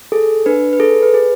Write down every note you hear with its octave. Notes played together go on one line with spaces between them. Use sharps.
G#4 A4
D4 B4
B4
G#4 A4
B4
G#4